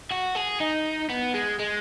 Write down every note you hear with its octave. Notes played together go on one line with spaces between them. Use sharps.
F#4
G#4
D#4
B3
G#3
G#3